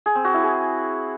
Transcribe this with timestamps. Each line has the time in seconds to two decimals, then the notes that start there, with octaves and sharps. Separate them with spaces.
0.06 G#4
0.15 C4
0.25 F#4
0.34 E4
0.43 G#4